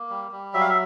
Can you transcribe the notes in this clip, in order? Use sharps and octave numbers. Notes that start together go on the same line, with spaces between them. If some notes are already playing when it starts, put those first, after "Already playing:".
Already playing: A#3
G3
G3
F#3 E5
F5
E5